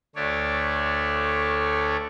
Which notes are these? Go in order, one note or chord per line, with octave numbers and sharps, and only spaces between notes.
D2 A3 D4 C#5 D5